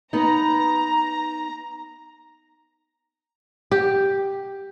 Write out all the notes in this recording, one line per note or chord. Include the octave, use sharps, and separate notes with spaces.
B3 D#4 A#5
G4